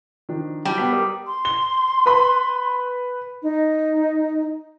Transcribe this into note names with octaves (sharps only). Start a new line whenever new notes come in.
D#3 F3 D4
F#3 G3 A5
B3 B6
A#4 D#6
C6
G7
B4 B5
D#4